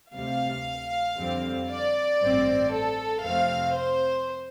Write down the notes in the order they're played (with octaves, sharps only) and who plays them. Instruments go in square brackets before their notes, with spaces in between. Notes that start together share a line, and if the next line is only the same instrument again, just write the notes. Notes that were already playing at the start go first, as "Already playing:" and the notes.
[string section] D2 C3 G3 F5
F2 D3 G3 C4
D5
A1 G2 G3 C4
A4
F2 C3 A3 C4 F5
C5